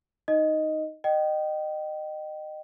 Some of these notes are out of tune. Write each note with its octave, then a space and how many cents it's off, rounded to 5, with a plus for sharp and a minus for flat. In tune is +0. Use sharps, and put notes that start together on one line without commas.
D#4 +0 D#5 +0
D#5 -25 G5 -25